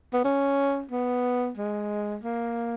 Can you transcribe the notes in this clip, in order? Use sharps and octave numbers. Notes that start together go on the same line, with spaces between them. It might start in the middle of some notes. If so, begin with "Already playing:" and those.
B3
C#4
B3
G#3
A#3